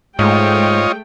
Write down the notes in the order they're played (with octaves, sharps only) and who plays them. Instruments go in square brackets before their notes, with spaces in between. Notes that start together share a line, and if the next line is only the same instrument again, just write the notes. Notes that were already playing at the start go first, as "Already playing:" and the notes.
[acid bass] G#2 [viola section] G#3 A3 G5 [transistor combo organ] F4 C#5 D#5